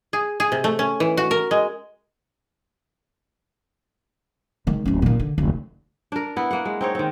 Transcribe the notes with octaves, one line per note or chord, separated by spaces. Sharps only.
G#4
G#4
C3
A3
C#4
E3
F#4
A#4
G#3
D#3 G#3
D1 C#4
A#2 D#3
D3
F1 D2
D4 A#4
B3 E4
A#3 F#5
G#3
C4 D#4 C#5
D#3 C4